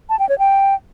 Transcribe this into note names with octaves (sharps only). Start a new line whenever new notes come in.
A5
G5
C#5
G5